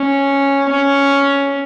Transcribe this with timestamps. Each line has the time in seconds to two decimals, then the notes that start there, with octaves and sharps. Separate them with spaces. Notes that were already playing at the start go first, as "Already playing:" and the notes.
Already playing: C#4
0.70 C#4